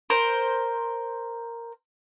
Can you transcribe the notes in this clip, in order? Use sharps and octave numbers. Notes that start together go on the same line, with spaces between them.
A#4 C5